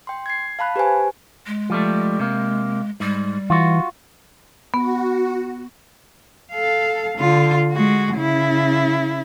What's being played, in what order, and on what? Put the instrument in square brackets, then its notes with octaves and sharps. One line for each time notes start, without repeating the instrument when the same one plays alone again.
[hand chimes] G5 C6
G#6 C7
F5 A5 B5 F#6
G4 B4 C5 G#5
[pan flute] G#3
[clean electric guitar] F3 G3 A3
C3 A#3
[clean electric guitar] G#2 [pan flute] G3
[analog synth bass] E3 [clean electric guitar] F4 F#4
[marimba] B3 [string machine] F#4
[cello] A4 F5
D3 F4
G#3 F#4
C#3 E4